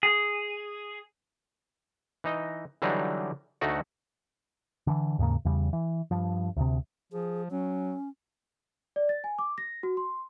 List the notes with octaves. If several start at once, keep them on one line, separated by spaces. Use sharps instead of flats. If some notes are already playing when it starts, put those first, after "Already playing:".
G#4
E3 D#4 D#5
D3 E3 F#3 G3 D4 D#4
D2 A3 D#4 F#4 F#5
D3 E3
D#2 G#2 C#3 A#3
E2 C#3 G3
E3
G2 F3
D2 C3
F3 G#4
F#3 C#4
D5
A6
G#5
D6
A#6
F#4
C6